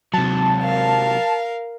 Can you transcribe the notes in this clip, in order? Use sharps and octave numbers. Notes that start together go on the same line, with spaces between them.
C3 F#3 A5
A#4 F5